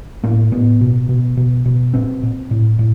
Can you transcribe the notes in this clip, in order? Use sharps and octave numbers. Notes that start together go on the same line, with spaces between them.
A2 A#3
A2 B3
B2
B2
B2
B2
A#2 C4
A#2
A2
A2